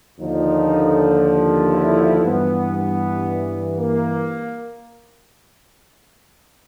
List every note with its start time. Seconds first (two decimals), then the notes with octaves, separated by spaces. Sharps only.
0.19 D#2 D3 F3 D#4
1.72 E4
2.23 G2 E3 B3
2.74 B3
3.77 A#3